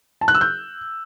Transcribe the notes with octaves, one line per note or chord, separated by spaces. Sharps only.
A5
F#6
E6
G6